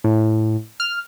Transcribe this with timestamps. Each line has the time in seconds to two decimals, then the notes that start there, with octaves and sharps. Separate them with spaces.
0.04 A2
0.80 F6